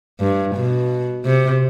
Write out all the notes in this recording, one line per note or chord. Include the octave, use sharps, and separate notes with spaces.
G2
B2
C3